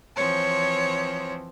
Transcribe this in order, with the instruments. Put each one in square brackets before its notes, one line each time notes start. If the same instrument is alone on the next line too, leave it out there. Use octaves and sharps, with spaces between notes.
[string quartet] E3 F3 C4 [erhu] C#5